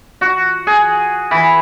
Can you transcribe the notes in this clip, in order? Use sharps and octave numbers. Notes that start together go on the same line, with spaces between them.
F#4
G#4
E3